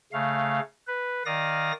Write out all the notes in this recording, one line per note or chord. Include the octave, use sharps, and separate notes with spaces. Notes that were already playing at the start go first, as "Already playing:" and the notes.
C#3 A3 F5
B4
D#3 D5 F5 D#6 A#6